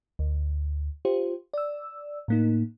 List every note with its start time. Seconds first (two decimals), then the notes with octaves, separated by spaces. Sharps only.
0.19 D2
1.05 F4 G4 C5
1.53 D5 E6
2.28 A2 A#3 D#4